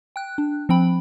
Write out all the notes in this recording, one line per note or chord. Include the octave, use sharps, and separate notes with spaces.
G5 F#6
D4
F3 C4 G5 B5